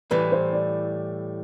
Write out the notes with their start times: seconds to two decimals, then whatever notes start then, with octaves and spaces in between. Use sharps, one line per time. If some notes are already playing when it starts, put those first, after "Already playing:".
0.11 A2 E3 G3 B4
0.32 C5
0.53 D5